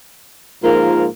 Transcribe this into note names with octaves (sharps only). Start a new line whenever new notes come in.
G#2 F3 A#3 F4 A#4